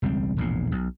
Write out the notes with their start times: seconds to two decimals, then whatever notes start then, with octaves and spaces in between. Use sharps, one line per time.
0.02 E1 C#2 G3 C4
0.37 E1 A#1 A2
0.72 B1